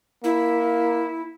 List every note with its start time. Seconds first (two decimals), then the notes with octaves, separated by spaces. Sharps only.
0.24 A#3 E4